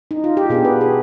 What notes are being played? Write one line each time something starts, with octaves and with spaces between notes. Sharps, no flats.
D#4
F4
G4
B2 B3 D4 G#4
B4
G#4